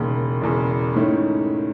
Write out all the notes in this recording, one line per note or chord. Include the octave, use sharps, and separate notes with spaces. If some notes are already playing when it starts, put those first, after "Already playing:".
Already playing: E1 D#2 C#3
E1 E2 C#3
G#2 D#3 A3 C#4 E4